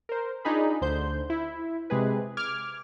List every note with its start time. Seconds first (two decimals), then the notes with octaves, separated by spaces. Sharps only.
0.09 A#4 C5
0.45 D4 D#4 F4 G#4 B5
0.81 D2 D3 C5 G6
1.30 E4
1.90 C3 G#3 G#4 B4
2.37 D6 F6 G#6